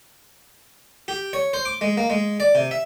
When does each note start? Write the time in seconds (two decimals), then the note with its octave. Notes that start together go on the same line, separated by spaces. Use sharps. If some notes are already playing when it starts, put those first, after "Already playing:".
1.08 G4
1.33 C#5
1.53 C5
1.65 D6
1.81 G#3
1.97 A#3
2.10 G#3
2.40 D5
2.55 C3
2.71 E5